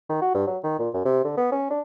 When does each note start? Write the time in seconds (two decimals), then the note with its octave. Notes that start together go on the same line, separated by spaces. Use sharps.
0.09 D#3
0.22 F#4
0.35 G2
0.47 F#3
0.64 D#3
0.79 A#2
0.94 F#2
1.05 C3
1.25 D3
1.37 B3
1.52 C#4
1.70 D4